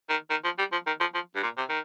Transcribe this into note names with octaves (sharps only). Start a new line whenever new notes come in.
D#3
D#3
F3
G3
F3
D#3
F3
F3
G2
A#2
C3
D#3